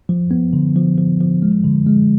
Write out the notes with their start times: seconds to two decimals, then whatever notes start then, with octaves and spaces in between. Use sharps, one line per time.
0.09 F3
0.31 B3
0.53 D3
0.76 F3
0.97 F3
1.20 F3
1.42 G#3
1.64 D3
1.87 G#3